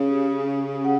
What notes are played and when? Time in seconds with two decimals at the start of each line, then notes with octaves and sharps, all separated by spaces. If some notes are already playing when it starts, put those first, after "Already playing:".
Already playing: C#3 C#4
0.10 G4
0.48 C#4
0.84 F#5